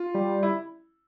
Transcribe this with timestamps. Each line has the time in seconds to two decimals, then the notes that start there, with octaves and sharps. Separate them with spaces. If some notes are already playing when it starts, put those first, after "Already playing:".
Already playing: F4
0.14 G3
0.43 E4